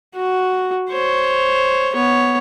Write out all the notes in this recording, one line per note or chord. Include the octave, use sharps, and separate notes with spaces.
F#4
C5 C#5
B3 C#5